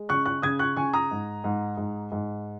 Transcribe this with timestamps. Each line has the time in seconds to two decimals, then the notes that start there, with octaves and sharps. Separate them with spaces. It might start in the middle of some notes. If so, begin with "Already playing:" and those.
Already playing: G#3
0.09 C#3 C#6 F#6
0.26 C#6 F#6
0.42 C#3 D#6 G#6
0.59 C#6 F#6
0.76 C#3 G#5 C#6
0.93 A#5 D#6
1.11 G#2
1.44 G#2
1.77 G#2
2.12 G#2